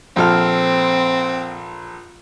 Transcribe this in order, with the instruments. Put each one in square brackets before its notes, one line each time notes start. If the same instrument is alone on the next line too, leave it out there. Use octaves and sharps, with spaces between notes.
[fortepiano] A#1 A4 F6 [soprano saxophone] C4